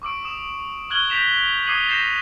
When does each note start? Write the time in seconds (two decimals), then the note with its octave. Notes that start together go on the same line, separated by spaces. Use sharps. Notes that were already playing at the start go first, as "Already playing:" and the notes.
0.02 C#6 D6 E6 D7
0.25 D#6 E7
0.90 C#6 F6 F#6 G#6 F#7 G7
1.09 G6 A#6 B6 D7 E7 F7
1.67 D6 D#6 G#6 C7 D#7 F#7
1.88 G6 A6 A#6 C7 E7